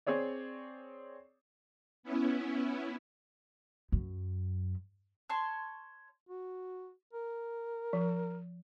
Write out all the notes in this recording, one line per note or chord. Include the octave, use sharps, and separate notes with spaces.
C4 G#4 C#5 D5
B3 C#4 E4
F#2
C#5 A5 C6
F#4
A#4
F3